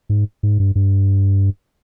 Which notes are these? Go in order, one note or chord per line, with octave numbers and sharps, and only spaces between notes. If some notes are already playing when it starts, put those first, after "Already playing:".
G#2
G#2
G2
G2